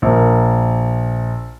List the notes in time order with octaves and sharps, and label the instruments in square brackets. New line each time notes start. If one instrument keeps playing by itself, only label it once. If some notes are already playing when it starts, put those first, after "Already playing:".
[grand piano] A#1 A#4